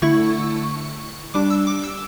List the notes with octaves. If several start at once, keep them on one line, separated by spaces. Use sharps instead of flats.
D3 A3 E4 C#6
G3 D4 D6
E6
D6
E6